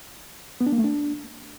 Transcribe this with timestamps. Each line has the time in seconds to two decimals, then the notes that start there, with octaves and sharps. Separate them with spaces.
0.61 B3
0.66 D4
0.72 A#3
0.78 A3
0.84 D4